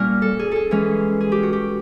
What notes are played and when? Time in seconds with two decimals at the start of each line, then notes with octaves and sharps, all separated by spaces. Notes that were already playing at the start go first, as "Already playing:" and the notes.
Already playing: A#2 G3 A#3 C#4 A#4
0.22 A4
0.39 G#4
0.51 G#4 A4
0.71 E3 G#3 C#4
1.20 G#4
1.32 G4
1.43 F#4
1.53 G4